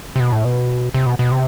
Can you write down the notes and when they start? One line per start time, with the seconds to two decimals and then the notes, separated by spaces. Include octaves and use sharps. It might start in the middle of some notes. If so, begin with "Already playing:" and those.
0.16 C3
0.20 B2
0.32 A2
0.45 B2
0.94 C3
1.06 B2
1.19 B2
1.31 C3